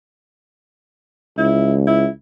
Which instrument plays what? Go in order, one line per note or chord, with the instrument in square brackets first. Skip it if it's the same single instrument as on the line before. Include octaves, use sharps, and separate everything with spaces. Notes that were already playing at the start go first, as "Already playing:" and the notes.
[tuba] C#2 [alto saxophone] E4
[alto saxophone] E4